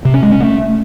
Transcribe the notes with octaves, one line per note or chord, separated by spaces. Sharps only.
C3
C#4
G#3
C#4
A3